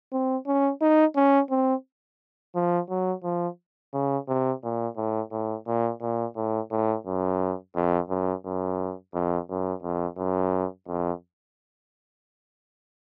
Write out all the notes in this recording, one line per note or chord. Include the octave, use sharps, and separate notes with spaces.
C4
C#4
D#4
C#4
C4
F3
F#3
F3
C#3
C3
A#2
A2
A2
A#2
A#2
A2
A2
F#2
F2
F#2
F#2
F2
F#2
F2
F#2
F2